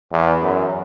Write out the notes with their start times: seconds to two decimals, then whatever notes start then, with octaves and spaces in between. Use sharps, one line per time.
0.12 E2
0.42 F#2